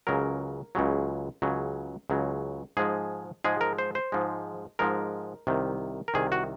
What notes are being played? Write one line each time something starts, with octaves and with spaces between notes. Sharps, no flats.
C#2 C#3 F#3 A#4
C#2 C#3 F#3
C#2 C#3 F#3
C#2 C#3 F#3
G#2 F3 G#3 G#4
G#2 F3 G#3 G#4
A#4
C5
C5
G#2 F3 G#3
G#2 F3 G#3 A#4
C2 C3 D#3
A#4
C2 C3 D#3 G#4
F#4